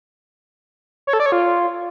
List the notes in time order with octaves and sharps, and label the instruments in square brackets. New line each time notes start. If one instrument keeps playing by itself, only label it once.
[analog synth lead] C#5
A4
D5
C#5
F4